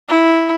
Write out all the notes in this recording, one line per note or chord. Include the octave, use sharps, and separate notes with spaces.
E4